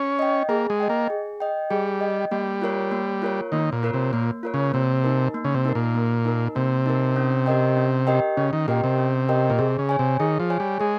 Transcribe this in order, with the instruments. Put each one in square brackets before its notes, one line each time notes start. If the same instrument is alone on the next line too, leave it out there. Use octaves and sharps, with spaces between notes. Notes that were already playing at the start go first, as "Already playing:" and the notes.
Already playing: [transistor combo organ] C#4
[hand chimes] D#5 G5
[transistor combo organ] A#3 [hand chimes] G#4
[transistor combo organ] G#3
[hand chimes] D#5 G5
[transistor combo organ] A#3
[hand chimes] G#4
D#5 G5
[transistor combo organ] G3 [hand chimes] G#4
[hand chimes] D#5 G5
[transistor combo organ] G3 [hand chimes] A#3
[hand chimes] F4 A#4 C#5
A#3
F4 A#4 C#5
[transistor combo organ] D#3 [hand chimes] A#3
[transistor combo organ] A#2
[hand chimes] F4 A#4 C#5
[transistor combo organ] C3
[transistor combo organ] A#2 [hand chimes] A#3
[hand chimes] F4 A#4 C#5
[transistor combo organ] C#3
[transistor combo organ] C3 [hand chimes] A#3
[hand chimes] D#4 A#4
A#3
[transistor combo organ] C#3
C3
[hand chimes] D#4 A#4
[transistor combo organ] A#2
[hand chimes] A#3
D#4 A#4
[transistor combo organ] C3 [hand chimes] A#3
[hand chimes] D#4 A#4
C#4
G4 A#4 D#5 G5
C#4
G4 A#4 D#5 G5
[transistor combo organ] C#3 [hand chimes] C#4
[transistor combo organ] D#3
[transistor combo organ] A#2 [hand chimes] G4 A#4 D#5 G5
[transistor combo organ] C3
[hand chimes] C#4
G4 A#4 D#5 G5
[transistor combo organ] A#2
[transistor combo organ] C3 [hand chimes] G#4
[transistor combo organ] C#3
[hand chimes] C#5 G#5
[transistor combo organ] C3
[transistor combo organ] D#3 [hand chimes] G#4
[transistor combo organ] F3
[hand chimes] C#5 G#5
[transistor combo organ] G3
[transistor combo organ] G#3 [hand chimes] G#4